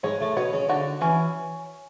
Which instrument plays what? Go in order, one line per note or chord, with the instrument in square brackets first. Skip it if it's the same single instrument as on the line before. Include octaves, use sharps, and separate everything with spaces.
[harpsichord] G#2 G#3 [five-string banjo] C#5
[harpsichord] A2 A3
[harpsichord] B2 B3 [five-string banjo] C#5
[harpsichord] C#3 C#4
[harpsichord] D3 D4 [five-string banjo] F#4
[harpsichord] E3 E4 [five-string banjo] C#4